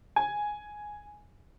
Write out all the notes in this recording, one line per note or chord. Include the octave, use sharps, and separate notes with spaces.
G#5